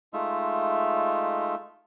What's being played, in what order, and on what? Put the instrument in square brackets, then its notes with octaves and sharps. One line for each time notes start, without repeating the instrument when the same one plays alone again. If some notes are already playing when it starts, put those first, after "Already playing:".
[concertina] G#3 A3 D#4 F4 E5